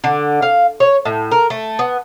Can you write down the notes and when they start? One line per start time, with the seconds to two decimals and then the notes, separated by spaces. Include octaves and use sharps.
0.04 D3
0.42 F5
0.80 C#5
1.05 A2
1.31 A#4
1.50 A3
1.79 B3